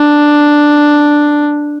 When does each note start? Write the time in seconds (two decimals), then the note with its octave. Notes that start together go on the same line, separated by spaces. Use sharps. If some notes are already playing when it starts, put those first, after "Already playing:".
Already playing: D4